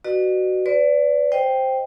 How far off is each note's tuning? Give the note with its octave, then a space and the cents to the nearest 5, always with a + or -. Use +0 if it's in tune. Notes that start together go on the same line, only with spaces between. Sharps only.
F#4 +10 B4 +0 D#5 -45
B4 +30 D5 -20
C5 +0 D#5 +0 G5 +0